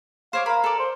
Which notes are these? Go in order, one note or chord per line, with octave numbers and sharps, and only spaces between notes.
C5 C#5 F5 D6
A#4 F5 B5
A4 D5
C5